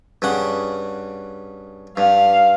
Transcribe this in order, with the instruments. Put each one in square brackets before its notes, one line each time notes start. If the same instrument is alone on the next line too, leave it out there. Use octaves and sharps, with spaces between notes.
[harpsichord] G2 C#3 F#5
[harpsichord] G2 [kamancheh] F5